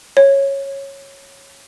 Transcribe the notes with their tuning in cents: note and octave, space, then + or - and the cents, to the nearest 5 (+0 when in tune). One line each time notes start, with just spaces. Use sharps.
C#5 -10